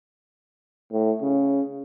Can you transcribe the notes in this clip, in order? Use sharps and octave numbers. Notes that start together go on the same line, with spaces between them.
A2
C#3